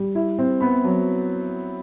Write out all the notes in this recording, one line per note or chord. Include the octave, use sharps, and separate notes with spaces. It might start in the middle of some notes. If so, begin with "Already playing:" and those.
Already playing: G3
E4
C4
B3 B5
F#3